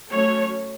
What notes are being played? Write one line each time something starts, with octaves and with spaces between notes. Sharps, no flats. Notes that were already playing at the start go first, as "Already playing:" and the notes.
F#3 A3 C#4 C#5